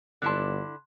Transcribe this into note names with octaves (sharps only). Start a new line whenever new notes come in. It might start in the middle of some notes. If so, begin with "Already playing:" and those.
G1 D3 E4 A5 C6 F#6